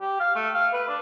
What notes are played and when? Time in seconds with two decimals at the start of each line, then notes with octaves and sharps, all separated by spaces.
0.01 G4
0.20 F5
0.36 A3
0.54 F5
0.73 B4
0.88 D4